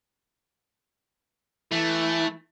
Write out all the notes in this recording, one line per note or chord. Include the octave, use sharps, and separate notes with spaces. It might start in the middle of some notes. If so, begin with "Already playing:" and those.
E3 A3